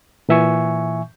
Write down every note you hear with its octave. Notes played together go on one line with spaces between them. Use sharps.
A#2 E3 E5 G#5 C#6